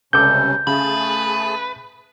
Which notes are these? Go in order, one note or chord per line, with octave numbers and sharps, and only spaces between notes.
C#2 C3 G3 C#4 A4 D6 G6
C#3 A3 G#4 B4 A5